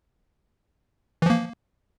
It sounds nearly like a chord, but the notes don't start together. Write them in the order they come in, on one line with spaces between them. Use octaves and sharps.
E3 F3 A#3